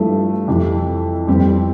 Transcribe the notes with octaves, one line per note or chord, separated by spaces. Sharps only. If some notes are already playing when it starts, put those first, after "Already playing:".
Already playing: G2 F3 A3 E4 A4
F2 C3 E3
F2 E3 G3 C4 G4